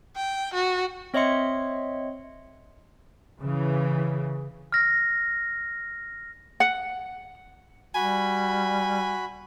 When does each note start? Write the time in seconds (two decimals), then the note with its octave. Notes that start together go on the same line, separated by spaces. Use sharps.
0.16 G5
0.53 F#4
1.14 C4 C#5 D#5 E5 C6 C#7
3.41 C#3 E3
4.72 F6 A#6
6.60 F#5
7.95 G3 F#4 G#5 B5